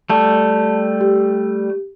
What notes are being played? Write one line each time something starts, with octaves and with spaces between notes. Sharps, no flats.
G3 A3 A5
G4